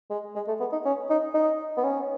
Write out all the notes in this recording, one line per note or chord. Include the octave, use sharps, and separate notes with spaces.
G#3
G#3
A3
B3
D#4
C#4
D#4
D#4
B3
C#4